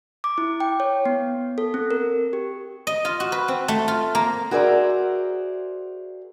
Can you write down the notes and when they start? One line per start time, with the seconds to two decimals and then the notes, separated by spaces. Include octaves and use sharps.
0.24 D6
0.38 E4
0.60 G5
0.80 C#5
1.05 B3
1.58 A4
1.74 C4
1.91 A#4
2.33 G4
2.87 D#5
3.05 F4
3.20 F#4
3.32 B4
3.48 C4
3.68 A3
3.88 F4
4.15 A#3
4.51 F#4 G#4 A#4 C5 D5 E5